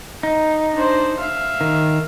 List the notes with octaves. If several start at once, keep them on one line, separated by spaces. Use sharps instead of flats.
D#4
D4 C5
E5 F5
D#3